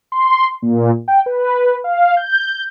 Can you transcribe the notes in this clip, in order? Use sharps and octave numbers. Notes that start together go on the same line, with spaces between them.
C6
A#2
G5
B4
F5
G6